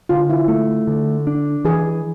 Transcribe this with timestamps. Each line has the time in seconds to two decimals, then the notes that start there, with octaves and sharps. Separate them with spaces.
0.09 D3 F4
0.30 E4
0.48 A3
0.87 D3
1.27 D4
1.65 E3 G#4